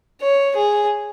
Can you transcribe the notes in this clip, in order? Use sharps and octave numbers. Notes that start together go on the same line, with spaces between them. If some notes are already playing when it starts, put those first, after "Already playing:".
C#5
G#4